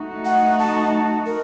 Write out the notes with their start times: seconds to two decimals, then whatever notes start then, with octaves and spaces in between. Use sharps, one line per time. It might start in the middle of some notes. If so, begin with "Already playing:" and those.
Already playing: A3 D#4 F#4
0.25 F#5
0.59 A5
1.26 A#4